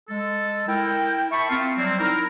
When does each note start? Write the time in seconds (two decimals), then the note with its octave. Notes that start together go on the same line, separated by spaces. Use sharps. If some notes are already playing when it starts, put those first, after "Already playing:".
0.09 G#3 A4
0.67 E4 A#4 G5
1.31 E5 A5 B5 C#6
1.49 C4 F4
1.76 F#3 G3 A#3 C4
1.99 D#4 E4 A#4